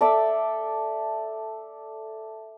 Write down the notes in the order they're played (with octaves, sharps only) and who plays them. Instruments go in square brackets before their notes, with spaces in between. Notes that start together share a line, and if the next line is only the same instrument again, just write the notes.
[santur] A4 D5 E5 D6